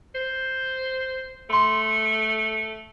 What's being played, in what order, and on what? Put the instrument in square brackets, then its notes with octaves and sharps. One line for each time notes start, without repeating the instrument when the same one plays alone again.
[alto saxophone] C5
[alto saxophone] A3 [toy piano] B5 C6